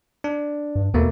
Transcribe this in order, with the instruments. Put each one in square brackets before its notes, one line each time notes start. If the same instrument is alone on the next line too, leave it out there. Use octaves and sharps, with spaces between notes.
[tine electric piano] D4
[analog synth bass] G2
[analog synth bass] D#2 [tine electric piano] B2 A3 A#3